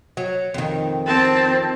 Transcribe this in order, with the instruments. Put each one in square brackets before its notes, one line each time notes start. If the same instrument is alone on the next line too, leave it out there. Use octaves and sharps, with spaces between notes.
[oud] F#3
F2 D#3
[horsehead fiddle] C4 A5